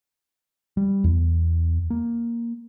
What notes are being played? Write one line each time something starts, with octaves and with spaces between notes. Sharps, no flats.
G3
E2
A#3